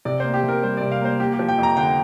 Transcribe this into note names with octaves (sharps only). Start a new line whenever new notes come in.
C3 D5
A#3 C5
G4
C3
A#4
G3 C5
C3 D5
F5
A#3 C5
A#3 G4
G4
F3
G5
F2
A#5
D3 G5